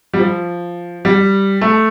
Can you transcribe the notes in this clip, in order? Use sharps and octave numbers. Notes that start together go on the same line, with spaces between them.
G3
F3
G3
A3